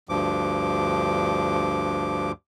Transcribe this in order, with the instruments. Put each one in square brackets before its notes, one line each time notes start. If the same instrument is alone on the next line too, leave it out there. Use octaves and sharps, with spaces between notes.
[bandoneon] D2 G2 F3 D6